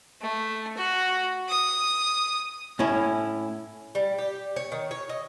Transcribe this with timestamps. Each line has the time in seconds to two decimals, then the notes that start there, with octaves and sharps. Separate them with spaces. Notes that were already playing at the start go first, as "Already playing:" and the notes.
0.22 A3
0.77 F#4
1.49 D#6
2.79 A2 C#4 E4
3.95 G3
4.18 G4
4.56 C#5
4.72 D#3
4.91 C#5
5.09 D#5